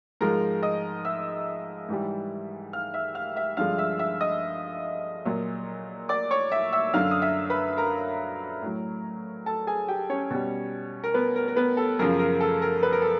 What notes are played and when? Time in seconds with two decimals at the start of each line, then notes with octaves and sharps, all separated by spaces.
0.21 G#2 F3 G#3 A#4 A#5
0.63 D#5 D#6
1.05 E5 E6
1.89 G#2 E3 G3
2.73 F5 F6
2.94 E5 E6
3.15 F5 F6
3.36 E5 E6
3.57 G2 D3 F3 G#3 F5 F6
3.78 E5 E6
3.99 E5 E6
4.21 D#5 D#6
5.25 A#2 F#3
6.09 D5 D6
6.31 C#5 C#6
6.52 E5 E6
6.73 E5 E6
6.93 F#2 D3 F#3 F5 F6
7.11 D#6
7.22 E5 E6
7.50 B4 B5
7.77 A#4 A#5
8.62 A2 F#3
9.46 A4 A5
9.67 G#4 G#5
9.88 G4 G5
10.10 C#4 C#5
10.31 B2 G3
11.04 A#4
11.14 B3 B4
11.36 A#4
11.48 A#4
11.56 B3 B4
11.77 A4
11.99 F#2 C#3 F3 A#4
12.19 A#4
12.41 A4
12.62 A#4
12.83 B4
12.93 A#4
13.02 A4